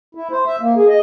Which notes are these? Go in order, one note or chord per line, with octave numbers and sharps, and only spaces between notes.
E4
C5
E5
A#3
G#4
D#5